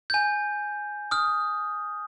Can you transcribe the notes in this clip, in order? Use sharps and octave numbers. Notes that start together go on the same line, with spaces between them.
G#5 G6
D#6 F6